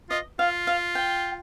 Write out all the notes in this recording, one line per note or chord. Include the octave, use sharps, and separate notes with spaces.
F4 D#5
F4 F5
F5
G5